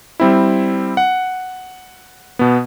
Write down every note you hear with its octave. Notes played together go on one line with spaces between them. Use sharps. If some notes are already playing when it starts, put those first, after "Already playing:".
G3 C4 E4
F#5
B2 B3